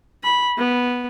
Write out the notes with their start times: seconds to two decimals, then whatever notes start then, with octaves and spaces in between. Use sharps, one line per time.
0.23 B5
0.58 B3